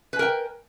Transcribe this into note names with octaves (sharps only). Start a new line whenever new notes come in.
A#4 B4 G5 G#5